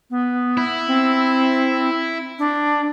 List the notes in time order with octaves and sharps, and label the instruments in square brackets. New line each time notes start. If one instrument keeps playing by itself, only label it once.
[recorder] B3
[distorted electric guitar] E4
[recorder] C4
D4